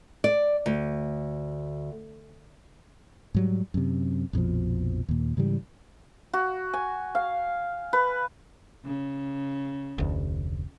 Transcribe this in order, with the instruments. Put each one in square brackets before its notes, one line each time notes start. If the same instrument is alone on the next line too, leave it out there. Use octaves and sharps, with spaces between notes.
[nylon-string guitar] D5
D2
[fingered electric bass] G#2 F#3 G3
F#2 C3
A#1 F2 B2 F3
D#2 A#2
G#2 C#3 E3 G3
[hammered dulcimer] F#4
G#5
F5
B4
[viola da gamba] C#3
[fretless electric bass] F1 D2